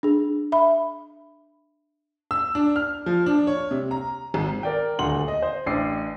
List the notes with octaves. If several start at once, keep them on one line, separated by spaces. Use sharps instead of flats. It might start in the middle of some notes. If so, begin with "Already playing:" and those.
D4 G#4
E5 B5
E6
D4
F6
F3
D4
C#5
C3
A#5
G#1
A#4 D5 G5
D#1 D2 F#5 C6 F#7
D#5
C5
A1 D4 D6 C7